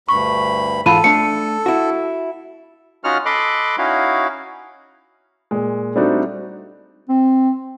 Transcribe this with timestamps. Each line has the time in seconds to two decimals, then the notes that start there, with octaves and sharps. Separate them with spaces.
0.09 D2 G2 B5 C#6
0.86 G#2 E3 F4 A4 A5 B5 D#7
1.04 A3 D4 C#7
1.66 E4 F#4
3.04 C#4 D#4 F4 F#4 F#5 F6
3.26 A4 D#5 B5 C6 D6 F#6
3.78 C#4 D#4 E4 F#4 F5
5.51 A#2 G#3
5.96 G3 A3 C4 D4 D#4 F#4
7.09 C4